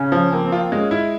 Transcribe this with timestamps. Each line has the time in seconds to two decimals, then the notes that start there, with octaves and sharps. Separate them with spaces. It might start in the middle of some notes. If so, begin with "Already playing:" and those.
Already playing: C#3 C#4
0.12 F3
0.32 A#3 C4
0.45 C4
0.52 F4
0.59 C4
0.71 G#3 C#4
0.91 E4